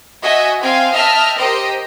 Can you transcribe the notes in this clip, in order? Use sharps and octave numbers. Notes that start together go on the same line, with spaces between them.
F#4 D#5 E5 G#5
C4 F5 G5 G#5
D#5 E5 G5 A5 F6
G4 A#4 C5 D#5 G5